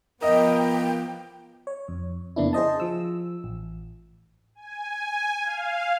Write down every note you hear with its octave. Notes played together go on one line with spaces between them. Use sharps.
F3 B3 A#4 D#5 G5
C#5
F2
F2 C#3 A#3 B3 D4 E4
G#4 C5 D#5 A5
F3 E6
A1
G#5
F5